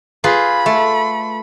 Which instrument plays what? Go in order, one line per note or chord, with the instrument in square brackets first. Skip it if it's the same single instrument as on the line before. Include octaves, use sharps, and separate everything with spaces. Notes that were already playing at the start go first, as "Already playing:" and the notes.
[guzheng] F4 G#4 B4 [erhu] B5
[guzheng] A3